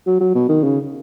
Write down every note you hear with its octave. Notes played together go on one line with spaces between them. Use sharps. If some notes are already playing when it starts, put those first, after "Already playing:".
F#3
F#3
B2
D#3
C#3